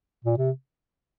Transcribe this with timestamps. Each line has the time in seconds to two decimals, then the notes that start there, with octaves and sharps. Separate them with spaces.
0.25 A#2
0.37 C3